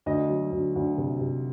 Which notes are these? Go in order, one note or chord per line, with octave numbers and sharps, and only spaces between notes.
D2 D#5
F#3
D2
D2
C3
C3